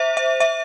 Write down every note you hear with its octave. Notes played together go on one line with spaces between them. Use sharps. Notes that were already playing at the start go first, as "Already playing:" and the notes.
Already playing: C5 E5
E5
E5